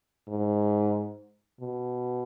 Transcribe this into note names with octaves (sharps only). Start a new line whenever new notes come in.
G#2
B2